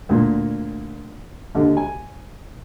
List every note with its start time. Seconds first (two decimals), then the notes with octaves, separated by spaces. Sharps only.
0.09 D2 A#2
1.55 D#2 D3
1.77 G#5